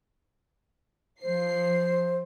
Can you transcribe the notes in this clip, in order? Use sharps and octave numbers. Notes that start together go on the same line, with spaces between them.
F3 C5 C7